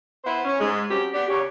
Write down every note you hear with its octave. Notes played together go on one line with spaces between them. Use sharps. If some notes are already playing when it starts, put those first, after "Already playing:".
B3 E4 C5
C#4
G#2 G#3
F#3 C4 C#4 G4
B3 D4 G4
D#2 C#3 G4 C#5